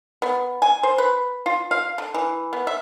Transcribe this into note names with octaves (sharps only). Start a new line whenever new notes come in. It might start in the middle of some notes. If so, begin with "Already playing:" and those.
B3
G#5
C5
B4
F4
F5
D3
E3
B3
E5